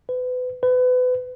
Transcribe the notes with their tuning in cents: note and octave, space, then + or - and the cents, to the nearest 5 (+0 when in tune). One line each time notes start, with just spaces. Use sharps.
B4 +30
B4 +30